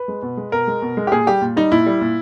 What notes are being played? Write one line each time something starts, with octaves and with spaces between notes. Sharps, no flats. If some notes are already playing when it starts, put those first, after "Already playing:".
Already playing: B4
G#3
B2
G#3
B2 A#4
G#3
B2
G#3
G4
A#2 G#4
G3 G4
A#2
G3 D#4
A#2 E4
G3
A#2